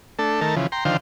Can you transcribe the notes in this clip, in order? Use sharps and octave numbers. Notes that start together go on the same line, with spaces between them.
A3 D4 A4
D#3 A3 A#4 A5
C#3 E3 F3
G5 A#5 C6
D3 D#3 F3 C5 F5 G5